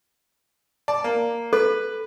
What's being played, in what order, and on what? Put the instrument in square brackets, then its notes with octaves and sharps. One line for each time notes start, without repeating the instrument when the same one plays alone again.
[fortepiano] D5 A5
A#3
[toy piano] A4 [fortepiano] B4